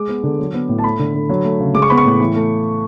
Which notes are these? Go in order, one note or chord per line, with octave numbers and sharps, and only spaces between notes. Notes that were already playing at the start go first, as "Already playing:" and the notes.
Already playing: G#3 D6
B3
D3
F#3
B3
A2
A5
A3 B5
D3
D3
F#3
A3
C#3
G#3 D6
C#6
B3 B5
C#6
A2
E3
A3